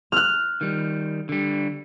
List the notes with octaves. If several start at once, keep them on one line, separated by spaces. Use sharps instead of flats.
F6 F#6
D#3 G3
D3 G3